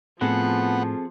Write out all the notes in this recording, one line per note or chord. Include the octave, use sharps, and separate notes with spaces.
A2 F3 B3 C4 G#4 A4 F#5